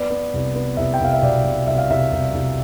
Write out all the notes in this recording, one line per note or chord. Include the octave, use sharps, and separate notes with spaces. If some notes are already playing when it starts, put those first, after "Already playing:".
Already playing: B3 D5
B3
C2
B3
C2 E5
G5
C2 F5
E5
B2 D5
B2
C2 E5
F5
C2 E5
C2
C2